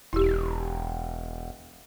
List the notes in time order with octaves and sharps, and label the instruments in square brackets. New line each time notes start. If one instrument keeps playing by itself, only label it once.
[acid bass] E1 [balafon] E4 G4